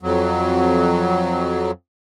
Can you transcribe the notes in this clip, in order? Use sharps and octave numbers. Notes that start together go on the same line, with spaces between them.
F2 F#3